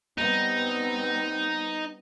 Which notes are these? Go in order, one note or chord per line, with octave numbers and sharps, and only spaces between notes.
G3 B3 C4 D#4